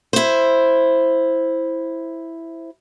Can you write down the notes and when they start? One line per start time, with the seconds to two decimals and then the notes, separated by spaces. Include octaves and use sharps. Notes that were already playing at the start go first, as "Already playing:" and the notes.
0.13 E4 C5